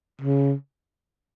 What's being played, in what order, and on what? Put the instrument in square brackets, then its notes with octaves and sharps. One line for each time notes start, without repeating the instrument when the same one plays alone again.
[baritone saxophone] C#3